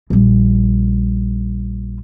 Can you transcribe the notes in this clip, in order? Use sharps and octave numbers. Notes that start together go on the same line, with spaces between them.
A#1 G3